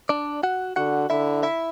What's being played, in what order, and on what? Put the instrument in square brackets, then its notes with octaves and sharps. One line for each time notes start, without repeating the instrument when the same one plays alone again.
[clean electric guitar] D4 D5
F#4 F#5
[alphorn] D3 [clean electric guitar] F#4 F#5
[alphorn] D3 [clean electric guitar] E4 E5
[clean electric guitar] E4 E5